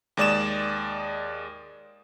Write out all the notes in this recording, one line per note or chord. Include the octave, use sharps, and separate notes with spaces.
D#2 G#3 D5 D#6 E7